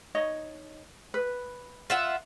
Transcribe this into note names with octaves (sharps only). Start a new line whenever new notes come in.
D#4 C#5 D#5
B4
F4 E5 F#5